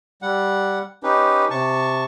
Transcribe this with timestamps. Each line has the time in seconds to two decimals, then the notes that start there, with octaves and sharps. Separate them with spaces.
0.22 G3 F#5
1.03 C#4 D#4 G4 B4
1.50 C3 A5 C#6